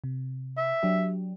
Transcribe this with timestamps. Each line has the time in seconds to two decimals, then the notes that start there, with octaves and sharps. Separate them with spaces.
0.04 C3
0.57 E5
0.83 F#3 D4 G4